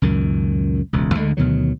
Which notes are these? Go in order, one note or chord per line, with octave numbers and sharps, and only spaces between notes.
C#2 F#2 A#2 D#3
E1 C#2
D2 D3 G#3
D2 B2 D#3 F#3